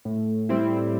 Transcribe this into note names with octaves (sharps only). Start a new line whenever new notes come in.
A2
G3 C4 E4